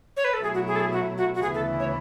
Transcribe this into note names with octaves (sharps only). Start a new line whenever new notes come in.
C#5
B4
A4
B2 F#3 A3 E4 G#4
F#4
G#4
A4
G#4
F#4
F#4
F#4
D2 C#3 E3 B3 E4 G#4
A4
C#5